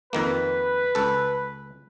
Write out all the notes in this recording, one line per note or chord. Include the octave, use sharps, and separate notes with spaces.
F2 D#3 A#3 B4
C#2 A4